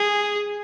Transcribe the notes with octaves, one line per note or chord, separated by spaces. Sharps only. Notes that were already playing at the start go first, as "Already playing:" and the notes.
Already playing: G#4